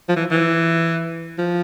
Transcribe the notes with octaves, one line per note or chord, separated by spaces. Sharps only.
F3
E3
E3
F3